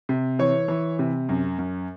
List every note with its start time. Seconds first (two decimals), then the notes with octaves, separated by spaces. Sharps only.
0.09 C3
0.39 E3 C#5
0.68 E3
0.99 C3
1.29 F#2
1.58 F#2